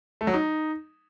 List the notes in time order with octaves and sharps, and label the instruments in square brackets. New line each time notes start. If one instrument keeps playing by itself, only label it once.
[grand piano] A3
F#3
D#4